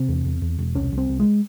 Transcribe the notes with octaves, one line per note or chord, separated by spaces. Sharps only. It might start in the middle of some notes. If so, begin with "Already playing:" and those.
Already playing: C3 C4
E2
E2
E2
E1
C2 C#4
C2
C4
C2
G#3